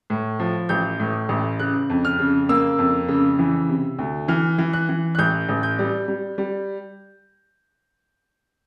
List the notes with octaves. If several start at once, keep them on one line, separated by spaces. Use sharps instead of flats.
A2
F3
A1 G6
A2
A1
C#3 F#6
F2
F6
C#3
A#3 E6
F2
C#3
E3
C3
D2
E3 F6
E3
F#6
E3
F#6
A1 G6
A1
G6
G3
G3
G3